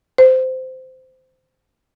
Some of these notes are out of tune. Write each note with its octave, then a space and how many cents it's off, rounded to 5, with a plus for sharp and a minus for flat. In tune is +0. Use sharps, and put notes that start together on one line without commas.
C5 -15